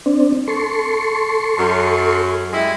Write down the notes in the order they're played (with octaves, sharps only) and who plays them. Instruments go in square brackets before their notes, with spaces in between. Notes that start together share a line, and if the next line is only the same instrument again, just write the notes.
[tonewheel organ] C4 D4
A4 C6 C#6
[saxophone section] F#2
G3 G#3 E4